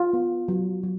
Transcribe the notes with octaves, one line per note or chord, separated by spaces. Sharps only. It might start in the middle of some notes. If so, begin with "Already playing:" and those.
Already playing: F4
B3
F#3
F#3